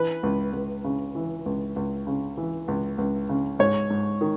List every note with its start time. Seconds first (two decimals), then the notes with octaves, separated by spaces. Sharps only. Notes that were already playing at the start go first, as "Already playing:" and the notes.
Already playing: E3 B4
0.23 C#2
0.53 C#2
0.84 C#3
1.15 E3
1.46 C#2
1.76 C#2
2.07 C#3
2.37 E3
2.68 C#2
2.98 C#2
3.29 C#3
3.59 G#2 C#5
3.90 G#2
4.21 D#3